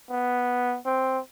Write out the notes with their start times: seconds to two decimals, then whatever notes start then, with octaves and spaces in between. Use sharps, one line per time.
0.10 B3
0.85 C4